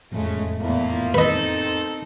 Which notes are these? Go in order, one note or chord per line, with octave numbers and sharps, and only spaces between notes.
E1 F2 A2 C#3 G#3 A3
E2 A#2 F3 A#3 E4
D#3 C4 D#4 A4 B4 C5 D#5